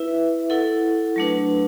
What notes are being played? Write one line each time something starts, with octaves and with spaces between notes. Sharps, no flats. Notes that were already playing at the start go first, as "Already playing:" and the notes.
Already playing: E4 B4 E5
E4 A4 F#5
F#3 A3 D4 B4